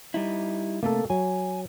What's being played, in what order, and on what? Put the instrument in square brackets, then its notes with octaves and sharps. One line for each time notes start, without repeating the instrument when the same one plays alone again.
[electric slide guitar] G3 D#4 E4
[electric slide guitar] C3 A3 [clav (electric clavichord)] A#3 A4
[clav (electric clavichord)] F#3 [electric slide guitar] G#5